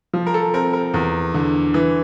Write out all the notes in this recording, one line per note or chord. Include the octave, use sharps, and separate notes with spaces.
F3
A#4
A4
C4 A#4
A#4
E2
D3
E3